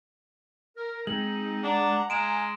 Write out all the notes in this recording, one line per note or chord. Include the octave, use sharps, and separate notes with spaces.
A#4
G#3 C4 D#4 F#7
D4 F#5 A#5
G#3 F5 G#5 A#5 D7 E7